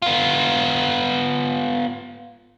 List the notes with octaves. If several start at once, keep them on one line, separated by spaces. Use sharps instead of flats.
B3 F4